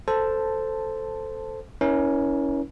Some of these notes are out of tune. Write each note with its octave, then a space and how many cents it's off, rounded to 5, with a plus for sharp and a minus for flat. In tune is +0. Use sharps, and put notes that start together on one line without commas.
A4 +5 C5 -5 A5 +0
C#4 +5 E4 -30 A#4 +35